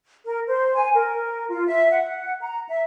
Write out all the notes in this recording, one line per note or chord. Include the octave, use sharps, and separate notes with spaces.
A#4
C5
G#5
A#4
F4
E5
F#5
A#5
E5